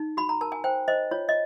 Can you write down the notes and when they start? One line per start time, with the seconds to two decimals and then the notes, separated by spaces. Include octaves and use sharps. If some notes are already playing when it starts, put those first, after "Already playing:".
Already playing: D#4
0.17 F#4 B5
0.29 A#5
0.41 A#4 A5
0.52 G#5
0.64 C5 G5
0.88 C5 D#5
1.11 F4 C#5
1.29 D#5